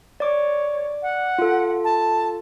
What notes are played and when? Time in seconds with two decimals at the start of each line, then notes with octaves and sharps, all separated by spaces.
0.20 C#5 D5 D6
1.02 F#5
1.39 F4 A4
1.84 A5